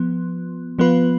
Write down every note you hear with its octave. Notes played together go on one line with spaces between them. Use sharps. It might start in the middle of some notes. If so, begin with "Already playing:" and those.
Already playing: F3 B3
F3 B3 F4 B4